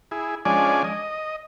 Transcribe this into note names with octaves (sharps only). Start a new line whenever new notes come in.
E4 G#4
F3 G#3 C#4 D4 D5 G#5
D#5